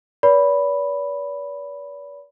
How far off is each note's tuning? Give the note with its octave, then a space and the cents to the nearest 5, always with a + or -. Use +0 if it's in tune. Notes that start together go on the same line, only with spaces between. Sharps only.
B4 -40 D5 -45 B5 +0